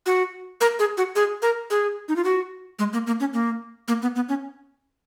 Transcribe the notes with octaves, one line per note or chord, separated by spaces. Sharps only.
F#4
A#4
G#4
F#4
G#4
A#4
G#4
D#4
F4
F#4
G#3
A#3
A#3
C#4
A#3
A#3
B3
B3
C#4